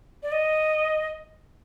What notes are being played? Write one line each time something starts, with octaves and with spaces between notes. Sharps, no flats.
D5
D#5